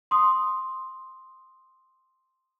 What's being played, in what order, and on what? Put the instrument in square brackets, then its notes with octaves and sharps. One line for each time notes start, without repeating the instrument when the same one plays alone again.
[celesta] C6 D#6